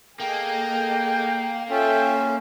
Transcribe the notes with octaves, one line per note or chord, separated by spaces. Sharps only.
A#3 G#4 A4 D#5 G5
C#4 F4 A4 E5 G5